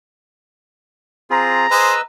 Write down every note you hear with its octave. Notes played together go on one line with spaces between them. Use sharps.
C4 F4 G#4 A#5
G#4 B4 C5 D#5 E6